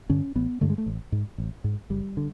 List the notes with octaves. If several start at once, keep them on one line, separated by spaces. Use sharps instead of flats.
G2 D3 C#4
A1 B3
G2 D3 A3
G#3
A3
A1
G#2
A1
G#2
F#1 G3
D3